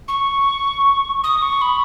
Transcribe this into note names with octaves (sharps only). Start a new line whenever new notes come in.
C#6
D#6
C#6
B5